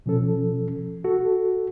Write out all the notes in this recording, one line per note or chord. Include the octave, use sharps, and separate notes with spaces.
B2 F3 C#4 A4
F#4 A4